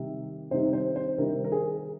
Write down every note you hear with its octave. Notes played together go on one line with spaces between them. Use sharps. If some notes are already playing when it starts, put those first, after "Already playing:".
Already playing: C3 D#3 G3
C3 D#3 G3 C4 D#4 C5
C5
C5
C3 D#3 G3 C4 D#4 A#4
A#4
G#4